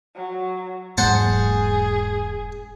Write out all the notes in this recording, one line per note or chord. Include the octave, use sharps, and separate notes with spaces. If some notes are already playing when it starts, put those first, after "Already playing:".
F#3
E1 G#2 F#3 A#3 G#4 C5 F#5 A5